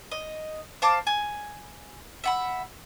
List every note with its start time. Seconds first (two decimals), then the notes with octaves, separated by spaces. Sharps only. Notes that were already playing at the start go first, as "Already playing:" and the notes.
0.11 D#5
0.82 C5 F5 A5 D6
1.07 G#5
2.24 E5 F#5 B5